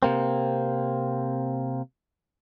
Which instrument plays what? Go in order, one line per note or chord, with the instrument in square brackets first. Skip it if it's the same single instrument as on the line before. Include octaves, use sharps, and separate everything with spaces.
[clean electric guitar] C3 A#3 C4